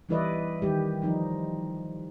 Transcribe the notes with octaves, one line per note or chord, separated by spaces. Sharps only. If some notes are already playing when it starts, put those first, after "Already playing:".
E3 G3 E4 B4 D5 D#5
D#3 G3 G4
F3 D#4